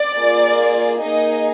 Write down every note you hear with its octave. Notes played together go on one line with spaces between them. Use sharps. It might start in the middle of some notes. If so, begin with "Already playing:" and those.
Already playing: D5
A#3 F4 G#4
A#3 D#4 G#4 D#5